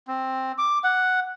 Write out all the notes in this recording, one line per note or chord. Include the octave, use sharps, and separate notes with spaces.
C4
D6
F#5